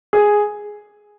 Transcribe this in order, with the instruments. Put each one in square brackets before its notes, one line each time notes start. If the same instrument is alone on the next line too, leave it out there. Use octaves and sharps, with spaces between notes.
[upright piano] G#4